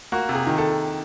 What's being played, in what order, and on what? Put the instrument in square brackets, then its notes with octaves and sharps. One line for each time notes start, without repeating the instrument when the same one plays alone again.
[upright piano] A#3 F#4
C3
G#4
D#3
A4